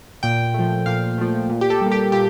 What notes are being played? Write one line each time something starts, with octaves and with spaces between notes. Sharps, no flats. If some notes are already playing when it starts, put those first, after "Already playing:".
A#2 G5
F3 A3
A#2 F5
F3 A3
A#2
G4
A4
G3 A#3
G4
A#2 G4